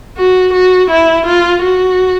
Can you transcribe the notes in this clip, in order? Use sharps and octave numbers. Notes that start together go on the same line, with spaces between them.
F#4
F#4
E4
F4
F#4